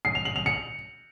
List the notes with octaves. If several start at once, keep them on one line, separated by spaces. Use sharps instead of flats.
C7
F7
F#7
F7
C#7